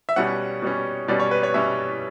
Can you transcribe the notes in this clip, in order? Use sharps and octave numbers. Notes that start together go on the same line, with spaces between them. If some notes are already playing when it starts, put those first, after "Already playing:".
E5
B2 G3 C#4 F#5
B2 G3 C#4
B2 G3 C#4 D5
C#5
B4
C#5
B2 G3 C#4 E5